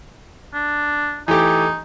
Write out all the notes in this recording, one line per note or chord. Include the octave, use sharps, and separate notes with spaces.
D4
E3 A3 D#4 G4